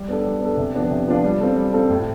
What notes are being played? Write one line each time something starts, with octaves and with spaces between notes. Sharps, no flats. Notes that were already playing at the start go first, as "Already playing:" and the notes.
Already playing: G3
B3 D4 A4
G3
B3 D4 A4
C3
F3 B3 D4 F4
C3
F3 B3 D4 F4
G3
C4 F4 A4
G3
C4 F4 A4
A2